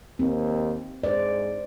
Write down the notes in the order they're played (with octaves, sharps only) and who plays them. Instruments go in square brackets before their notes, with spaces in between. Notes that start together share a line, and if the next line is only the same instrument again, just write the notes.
[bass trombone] D#2 [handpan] C4
[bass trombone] G#2 [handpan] C5 D5